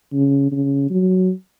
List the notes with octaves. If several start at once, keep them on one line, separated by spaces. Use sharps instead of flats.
C#3
C#3
F#3